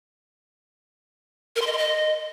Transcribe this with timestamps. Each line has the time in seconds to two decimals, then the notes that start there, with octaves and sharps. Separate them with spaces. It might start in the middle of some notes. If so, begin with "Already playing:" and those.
1.56 A#4
1.61 C6
1.67 D#5
1.72 C6
1.78 D#5